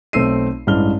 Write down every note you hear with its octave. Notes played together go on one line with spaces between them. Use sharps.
B1 A3 C4 E6 C7 D#7
A1 G2 E3 G#3 F6 G7